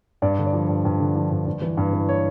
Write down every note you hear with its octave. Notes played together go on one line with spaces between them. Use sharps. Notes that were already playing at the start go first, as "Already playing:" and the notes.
G2 D5
D3
D5
F3
G2
G2
D3
F3
G2
G2
E3
G2
E3
C#5